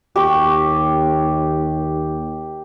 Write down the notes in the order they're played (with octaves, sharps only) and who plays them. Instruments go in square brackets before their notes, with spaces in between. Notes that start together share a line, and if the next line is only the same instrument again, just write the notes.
[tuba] D#2 [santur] G4 G5 C#6